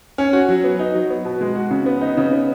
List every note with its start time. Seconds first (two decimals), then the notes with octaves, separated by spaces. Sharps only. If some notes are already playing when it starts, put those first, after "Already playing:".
0.18 C#4
0.33 F#4
0.48 F#3
0.64 B3
0.79 D#4
0.94 F#3
1.10 B3
1.25 B2
1.41 G#3
1.55 F#4
1.71 C#3
1.86 B3
2.01 D#4
2.17 C#3
2.33 B3